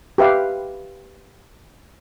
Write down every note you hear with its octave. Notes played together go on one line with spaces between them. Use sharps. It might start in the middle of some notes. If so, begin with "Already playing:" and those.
G4 B4 E5 F5